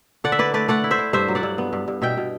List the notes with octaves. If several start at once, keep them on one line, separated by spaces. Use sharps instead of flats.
D3 D5 F#5
E5
E4 B4 D5
A3 B4 D5
A3 D5 F#5
E4
C5 E5
E4
G2 C5 E5
F#3
D5 F#5
G2
B3
G2
G2
B2 E5 G5
B2